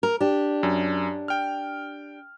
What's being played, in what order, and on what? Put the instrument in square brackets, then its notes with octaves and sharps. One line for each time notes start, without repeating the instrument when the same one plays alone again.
[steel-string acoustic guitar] A#4
D4 G4
[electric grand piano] F#2
G5 F6